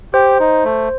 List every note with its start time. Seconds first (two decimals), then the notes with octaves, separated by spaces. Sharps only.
0.14 G4 C5
0.40 D#4
0.64 A3